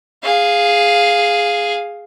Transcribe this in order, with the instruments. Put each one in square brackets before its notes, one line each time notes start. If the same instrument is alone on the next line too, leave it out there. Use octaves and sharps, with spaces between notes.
[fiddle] G#4 F5